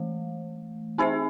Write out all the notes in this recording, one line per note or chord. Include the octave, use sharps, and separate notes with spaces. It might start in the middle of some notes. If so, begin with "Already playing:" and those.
Already playing: E3 A3
C4 D#4 G#4 C5 E5